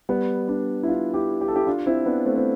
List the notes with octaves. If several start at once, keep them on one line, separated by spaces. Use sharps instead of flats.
G3 B3
B3 D4
E4
D4 F4
E4 G4
G4
A4
E4 G4
D4 F4
C4 E4
B3 D4
A3 C4
C4